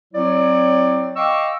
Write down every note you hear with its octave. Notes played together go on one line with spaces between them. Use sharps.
F#3 C4 E4 C#5 D5
D#5 F5 G5 C#6 D6 E6